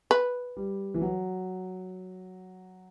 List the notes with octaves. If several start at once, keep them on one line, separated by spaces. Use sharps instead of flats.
B4
G3
E3
F#3